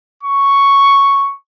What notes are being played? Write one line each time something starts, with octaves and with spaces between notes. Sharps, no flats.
C#6